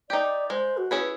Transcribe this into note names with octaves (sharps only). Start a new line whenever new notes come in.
D#4 G4 D5
G#3 C5
F#4
C#4 E4 G#4 B4